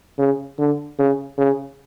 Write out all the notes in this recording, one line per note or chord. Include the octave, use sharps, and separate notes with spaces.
C#3
D3
C#3
C#3